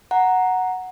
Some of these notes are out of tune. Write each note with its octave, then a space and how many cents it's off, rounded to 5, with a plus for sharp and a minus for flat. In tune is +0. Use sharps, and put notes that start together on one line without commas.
F#5 +0 A#5 +0